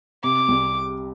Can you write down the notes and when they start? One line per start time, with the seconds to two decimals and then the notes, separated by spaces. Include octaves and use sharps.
0.24 C3 D6
0.48 C2